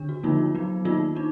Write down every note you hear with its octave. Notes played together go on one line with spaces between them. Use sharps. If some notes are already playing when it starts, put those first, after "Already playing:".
Already playing: D3 D4
F#4
D3 F3 A#3 D#4 F4
F#3 B3 D#4
D#3 A#3 D#4 F4
D4 D#4